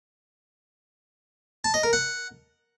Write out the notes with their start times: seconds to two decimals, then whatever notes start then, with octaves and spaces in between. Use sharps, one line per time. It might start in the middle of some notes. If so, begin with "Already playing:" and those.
1.64 A5
1.74 D#5
1.83 A#4
1.93 F#5